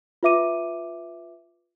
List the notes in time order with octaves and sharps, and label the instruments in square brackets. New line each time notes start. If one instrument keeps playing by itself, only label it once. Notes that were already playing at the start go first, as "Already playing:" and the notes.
[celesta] F4 B4 E5 D6 D#7